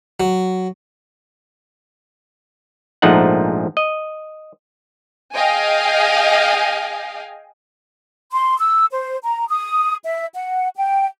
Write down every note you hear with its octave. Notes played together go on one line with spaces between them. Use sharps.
F#3
A#1 G#2 F3 A3 D#4 F#5
D#5
G#4 D#5 F5 G5 G#5
C6
E6
C5
A#5
D#6
E5
F#5
G5